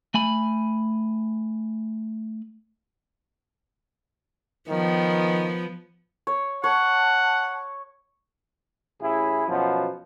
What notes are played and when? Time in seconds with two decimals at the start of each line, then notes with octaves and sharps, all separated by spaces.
0.14 A3 G#5 B5
4.68 D#3 F3 B3
6.27 C#5
6.64 C#5 F#5 A5
9.01 A1 E4 G#4
9.48 F#2 B2 F3